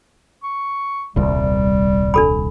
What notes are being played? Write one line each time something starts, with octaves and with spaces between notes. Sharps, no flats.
C#6
D#1 C2 G3
D4 A4 B5